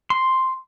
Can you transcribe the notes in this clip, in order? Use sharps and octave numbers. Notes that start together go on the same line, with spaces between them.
C6